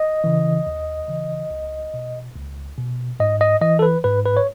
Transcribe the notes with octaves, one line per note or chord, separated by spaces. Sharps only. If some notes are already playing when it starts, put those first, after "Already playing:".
Already playing: D#5
C#3 E3
D#2
C#3 E3
C#2
B2
C#2
B2
G#2 D#5
D#5
E3 D#5
A4
B4
G#2 B4
B4
C#5